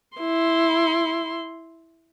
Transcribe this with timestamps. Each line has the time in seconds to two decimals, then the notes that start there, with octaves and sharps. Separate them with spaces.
0.17 E4 C6